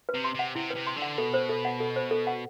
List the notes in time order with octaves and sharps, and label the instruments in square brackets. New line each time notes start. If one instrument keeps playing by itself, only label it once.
[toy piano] B4
[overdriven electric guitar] C3
[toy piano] C6
[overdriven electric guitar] C3 [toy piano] F#5
[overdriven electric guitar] C3 [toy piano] E4
[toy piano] B4
[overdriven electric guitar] C3
[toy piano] C6
[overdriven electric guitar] D3
[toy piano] F#5
[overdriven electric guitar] B2 [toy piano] A4
[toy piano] C5
A4
F#5
A4
C5
A4
F#5